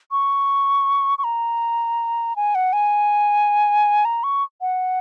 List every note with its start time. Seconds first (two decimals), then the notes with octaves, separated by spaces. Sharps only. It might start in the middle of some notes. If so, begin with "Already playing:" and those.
0.11 C#6
1.18 C#6
1.24 A#5
2.36 G#5
2.55 F#5
2.73 G#5
4.05 A#5
4.24 C#6
4.61 F#5